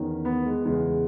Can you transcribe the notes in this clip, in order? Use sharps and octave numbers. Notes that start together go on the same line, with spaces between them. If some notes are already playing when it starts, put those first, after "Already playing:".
Already playing: E2 D#3 C#4
B3
G#3
E2 C#3 E3 G#3